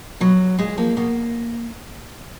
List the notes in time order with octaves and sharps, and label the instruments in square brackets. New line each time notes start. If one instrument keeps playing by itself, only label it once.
[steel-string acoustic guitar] B2 F#3
A#2 G#3
F3 A#3
B2 A#3